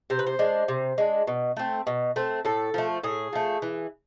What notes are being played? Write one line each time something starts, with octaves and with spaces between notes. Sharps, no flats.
C3 C5
B4
C5
G#3 D4
C3
G#3 D4
B2
A3 C4
B2
A3 C4
A2 A4
F3 A3
A2 G#4
F3 A3
E3